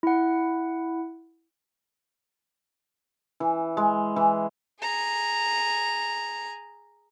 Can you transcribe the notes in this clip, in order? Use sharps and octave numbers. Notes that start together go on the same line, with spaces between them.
E4 F#5
E3
G#3
E3
G#4 A#5